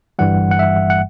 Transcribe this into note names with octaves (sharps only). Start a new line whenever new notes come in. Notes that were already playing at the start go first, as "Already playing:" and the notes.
G1 G2 E3 G3 F#5
F#5
E5
F#5